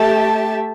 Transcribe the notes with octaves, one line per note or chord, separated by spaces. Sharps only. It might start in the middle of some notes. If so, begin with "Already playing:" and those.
Already playing: A3 G4 E5 A5